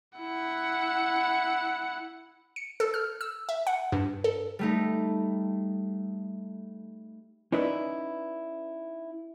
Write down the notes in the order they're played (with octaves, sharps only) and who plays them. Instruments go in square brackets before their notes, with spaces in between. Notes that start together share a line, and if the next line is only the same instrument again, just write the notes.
[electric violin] E4 F#5
[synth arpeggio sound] C#7
A4
F6
E6
E5
F#5
G2
A4
[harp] G3 A3 D#4
[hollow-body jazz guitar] C#4 D#4 E4 B4 D5